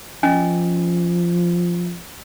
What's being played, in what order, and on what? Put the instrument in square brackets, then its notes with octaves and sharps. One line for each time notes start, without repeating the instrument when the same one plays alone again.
[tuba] F3 [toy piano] C#4 D#5 G#5